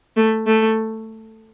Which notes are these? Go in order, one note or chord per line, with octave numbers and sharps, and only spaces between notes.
A3
A3